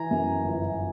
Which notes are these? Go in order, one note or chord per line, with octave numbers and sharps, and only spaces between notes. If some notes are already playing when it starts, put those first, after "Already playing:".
Already playing: E3 G#5 A#5
F#2
G1